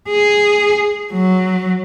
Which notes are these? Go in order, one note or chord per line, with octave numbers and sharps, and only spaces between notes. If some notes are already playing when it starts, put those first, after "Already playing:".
G#4
F#3